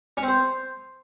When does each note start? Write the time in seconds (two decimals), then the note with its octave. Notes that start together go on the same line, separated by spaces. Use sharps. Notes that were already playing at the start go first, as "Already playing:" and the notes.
0.17 C#4
0.23 C4
0.28 C5